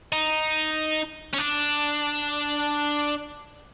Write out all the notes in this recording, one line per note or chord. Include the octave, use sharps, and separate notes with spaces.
D#4
C#4
D4